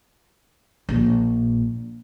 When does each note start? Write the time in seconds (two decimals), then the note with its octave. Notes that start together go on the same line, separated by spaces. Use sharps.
0.89 A#1 A#2